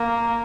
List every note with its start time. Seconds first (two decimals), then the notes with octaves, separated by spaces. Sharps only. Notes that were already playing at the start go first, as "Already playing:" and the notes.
Already playing: A#3